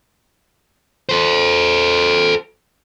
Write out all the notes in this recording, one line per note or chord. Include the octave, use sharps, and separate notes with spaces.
A4 C5